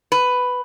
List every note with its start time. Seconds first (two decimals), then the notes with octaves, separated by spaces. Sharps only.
0.12 B4